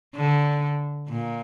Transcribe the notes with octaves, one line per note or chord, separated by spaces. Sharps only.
D3
A#2